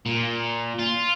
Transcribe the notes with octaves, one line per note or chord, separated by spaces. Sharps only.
A#2
F4